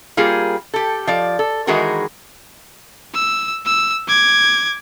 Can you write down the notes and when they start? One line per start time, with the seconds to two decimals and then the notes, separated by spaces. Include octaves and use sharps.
0.17 G3 A#3 F4 G#4
0.74 G4 A4
1.07 F3 D5
1.39 A4
1.67 D#3 E3 G#3 F#4 G#4 A#4
3.14 E6
3.65 E6
4.08 D6 G#6